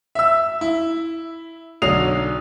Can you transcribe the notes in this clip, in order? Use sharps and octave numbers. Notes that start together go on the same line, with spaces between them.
E5 E6
E4
B1 D3 F#3 D#6 C7 F7